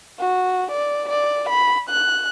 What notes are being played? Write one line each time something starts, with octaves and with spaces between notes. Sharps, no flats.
F#4
D5
D5
B5
F#6